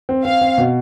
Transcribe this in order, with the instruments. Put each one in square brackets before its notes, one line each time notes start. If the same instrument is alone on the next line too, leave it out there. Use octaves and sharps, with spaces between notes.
[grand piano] C4
[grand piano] C4 [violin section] F5
[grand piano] C4
B2